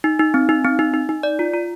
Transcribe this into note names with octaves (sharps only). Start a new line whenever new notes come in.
D#4
D#4
C4
D#4
C4
D#4
D#4
D#4
D5
F4
F4